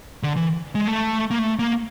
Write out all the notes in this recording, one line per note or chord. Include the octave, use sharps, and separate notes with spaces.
D3
E3
G#3
A3
A#3
A3
A#3